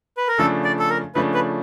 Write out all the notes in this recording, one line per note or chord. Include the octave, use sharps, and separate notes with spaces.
B4
A#4
C#3 F3 A3 D4 A4
D5
A4
A#4
C#3 F3 A3 D4 B4
B4